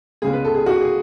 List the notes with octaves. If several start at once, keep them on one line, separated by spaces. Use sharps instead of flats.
C#2 C#3 G#3 B3 G#4
B4
A4
G#4
F#4
G#4